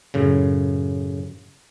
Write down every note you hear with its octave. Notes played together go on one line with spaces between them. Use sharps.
F#2 A2 C#3